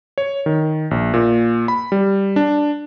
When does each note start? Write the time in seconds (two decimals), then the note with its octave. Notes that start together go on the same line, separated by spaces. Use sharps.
0.18 C#5
0.46 D#3
0.91 A#1
1.14 A#2
1.68 B5
1.92 G3
2.36 D4